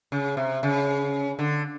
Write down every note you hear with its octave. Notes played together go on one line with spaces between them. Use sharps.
C#3
C3
C#3
D3